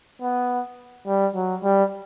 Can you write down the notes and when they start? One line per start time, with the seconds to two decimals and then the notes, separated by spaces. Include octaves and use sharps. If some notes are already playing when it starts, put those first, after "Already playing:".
0.22 B3
1.07 G3
1.35 F#3
1.63 G3